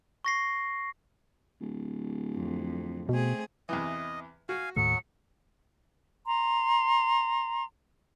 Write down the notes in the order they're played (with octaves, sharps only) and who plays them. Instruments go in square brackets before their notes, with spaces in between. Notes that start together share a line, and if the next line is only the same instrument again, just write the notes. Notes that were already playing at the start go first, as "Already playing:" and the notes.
[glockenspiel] C#6 A#6 C7
[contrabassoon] D1
[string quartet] F2
[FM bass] B2 [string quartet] A3 C4 G#4
[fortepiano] E2 C3 E3 [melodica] D#5
[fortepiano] F#4 [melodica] F5 G#5
[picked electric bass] D#2 A2 A3 [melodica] F#3 [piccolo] C#7
[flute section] A#5 C6